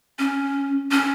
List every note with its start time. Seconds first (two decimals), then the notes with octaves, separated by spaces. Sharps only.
0.19 C#4
0.91 C#4